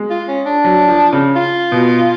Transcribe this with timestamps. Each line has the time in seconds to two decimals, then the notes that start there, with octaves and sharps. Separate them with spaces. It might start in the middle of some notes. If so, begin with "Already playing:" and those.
Already playing: G#3
0.10 F4
0.28 C#4
0.46 D4
0.64 F#3
0.88 F3
1.12 C#3
1.36 F4
1.72 B2